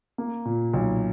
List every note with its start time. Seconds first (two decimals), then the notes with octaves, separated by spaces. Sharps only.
0.18 A#3
0.45 A#2
0.73 B1